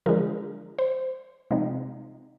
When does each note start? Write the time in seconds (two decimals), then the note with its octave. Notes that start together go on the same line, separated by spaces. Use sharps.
0.06 D3 F3 G#3 D4 A#4
0.79 C5
1.51 C3 F3 G#3 C4 D#4